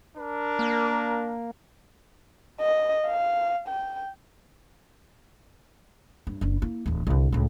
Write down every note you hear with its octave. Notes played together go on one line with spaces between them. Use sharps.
D4 A#4
A#3
D#5
F5
G5
G2
F#1 D4
A#3 E4
D1 E2
C2 D3
C#2 A2